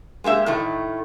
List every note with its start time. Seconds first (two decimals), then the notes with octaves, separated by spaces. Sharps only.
0.24 G#3 A#3 G4 E5
0.46 A2 D#3 A3